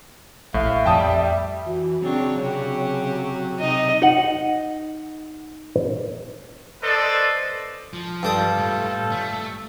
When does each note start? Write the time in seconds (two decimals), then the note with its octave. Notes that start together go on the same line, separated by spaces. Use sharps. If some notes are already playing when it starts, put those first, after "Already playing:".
0.54 A#1 A2 E5 F5
0.86 F2 G3 G5 A5 D#6
1.66 E3 F#4
2.02 C#3 F#3 C4 D4 C#5
2.42 C3 F#4 G4
3.60 C3 D#4 D#5
4.02 D#4 D#5 F#5
6.83 A4 B4 C5 D5 D#5
7.93 F3
8.23 G2 G3 F4 A4 D6 D#6
8.58 A2
9.12 A3